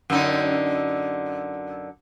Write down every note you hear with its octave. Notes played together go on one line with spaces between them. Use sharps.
F#2 D3 D#4